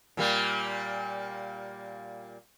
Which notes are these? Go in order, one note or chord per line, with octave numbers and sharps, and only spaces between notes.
A#2 G3 A#3